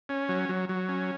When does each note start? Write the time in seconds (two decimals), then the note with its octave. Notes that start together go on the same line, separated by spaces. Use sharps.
0.09 C#4
0.29 F#3
0.49 F#3
0.69 F#3
0.89 C#4